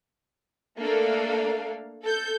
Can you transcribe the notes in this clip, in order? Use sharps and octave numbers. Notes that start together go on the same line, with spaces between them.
A3 A#3 D4 A4 F5
A4 G6